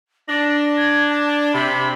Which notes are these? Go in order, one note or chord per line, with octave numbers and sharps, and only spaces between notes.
D4 A#6
G#6
A5
C3 B5